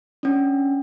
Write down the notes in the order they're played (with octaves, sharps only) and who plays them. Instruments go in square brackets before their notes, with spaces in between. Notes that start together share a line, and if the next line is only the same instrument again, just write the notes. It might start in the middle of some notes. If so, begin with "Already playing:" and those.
[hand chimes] C#4 D4